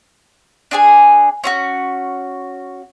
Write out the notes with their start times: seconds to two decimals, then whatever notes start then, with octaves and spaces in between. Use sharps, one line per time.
0.71 D4 G#4 G#5
1.44 C#4 F4 F#4